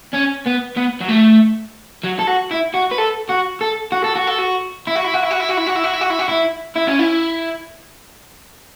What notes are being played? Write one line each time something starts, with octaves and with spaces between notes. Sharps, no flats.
C#4
B3
B3
F#3
A3
F#3
A4
F#4
E4
F#4
B4
A4
F#4
A4
F#4
A4
F#4
A4
F#4
E4
F#4
E4
F#4
E4
F#4
E4
F#4
E4
F#4
E4
F#4
E4
F#4
E4
F#4
E4
E4
C#4
E4